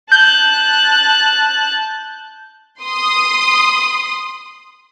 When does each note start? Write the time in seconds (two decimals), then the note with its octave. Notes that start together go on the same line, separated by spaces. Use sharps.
0.12 A5 F#6 G6
2.83 C6 D#6